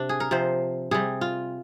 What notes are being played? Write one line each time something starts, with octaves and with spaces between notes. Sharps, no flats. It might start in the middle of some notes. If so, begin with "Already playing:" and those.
Already playing: C3 D4
G#4
A#4
C3 F3 C5
C3 G3 G#4
F4